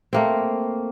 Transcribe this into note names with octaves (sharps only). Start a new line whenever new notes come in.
A3 A#3 C4